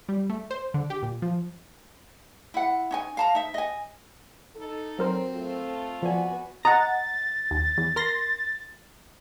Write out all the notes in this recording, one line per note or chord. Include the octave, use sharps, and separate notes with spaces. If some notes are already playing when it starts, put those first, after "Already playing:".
G3
A3
C5
D3
G4
A#2
F3
E4 F#5
C#4 D#4 G#5
F5 A5 A#5
D#4 E5
D#5 G#5
D#4 A4
F#3 C4 A#4 C5
A3 F4 A4
F3 B3 F#4 D5 G#5
D#5 F#5 A#5 A6
D#2
E2
A#4 C6 A#6